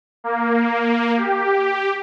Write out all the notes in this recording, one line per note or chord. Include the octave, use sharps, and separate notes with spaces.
A#3
G4